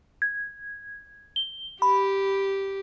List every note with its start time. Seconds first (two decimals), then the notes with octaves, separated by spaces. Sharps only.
0.22 G#6
1.36 G7
1.82 G4 B5